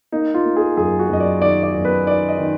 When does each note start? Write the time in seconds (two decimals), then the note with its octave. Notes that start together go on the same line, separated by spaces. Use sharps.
0.12 A#3 D#4
0.34 F4
0.45 A#3
0.56 G#4
0.77 F#2 G#4
0.99 F#4
1.10 F#2 D#5
1.20 D5
1.42 D#3 D5
1.63 D5
1.74 F#2
1.85 B4
2.06 D#3 D5
2.29 D#5
2.38 D#3